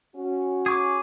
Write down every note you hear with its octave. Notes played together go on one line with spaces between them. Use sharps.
C#4 F#4
G#4 C#6 D6